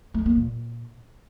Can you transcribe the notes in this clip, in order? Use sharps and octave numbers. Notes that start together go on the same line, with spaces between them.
A3
A#3
A#2